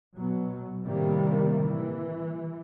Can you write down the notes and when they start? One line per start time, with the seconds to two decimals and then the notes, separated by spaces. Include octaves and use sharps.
0.15 B2 F#3
0.84 A2 C3 D#3 G3 A#3
1.65 E3